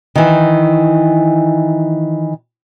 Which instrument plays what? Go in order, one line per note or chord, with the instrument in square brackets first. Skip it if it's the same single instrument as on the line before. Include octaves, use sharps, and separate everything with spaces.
[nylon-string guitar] D#3 E3